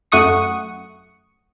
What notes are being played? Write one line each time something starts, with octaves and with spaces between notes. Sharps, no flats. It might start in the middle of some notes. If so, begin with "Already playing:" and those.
F#2 A3 F#5 C#6 D#6 C#7